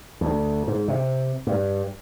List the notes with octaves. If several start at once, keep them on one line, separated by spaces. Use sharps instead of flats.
D2
G#2
C3
G2